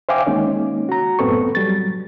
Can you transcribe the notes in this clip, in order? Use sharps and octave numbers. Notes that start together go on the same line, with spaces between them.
C5 E5 F5 G5 G#5 D6
D#3 G#3 A#3 C#4 D#4
F#4 A#5
F#2 A2 B3 C4 A4 C#6
F#3 G3 A6